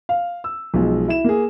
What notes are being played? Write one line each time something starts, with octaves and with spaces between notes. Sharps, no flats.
F5
E6
B1 F3 G#3
E4 E7
A#3 G#4